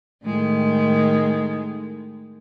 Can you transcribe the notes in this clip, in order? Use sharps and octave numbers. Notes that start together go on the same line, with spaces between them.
A2 D#3 G#3